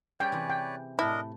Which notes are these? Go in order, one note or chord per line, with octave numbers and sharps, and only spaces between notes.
G3 C#4 G#4 B4 C#5 D5 G5
C3 E3 E4
G5
A2 D4 E4 A#4 D#5 A5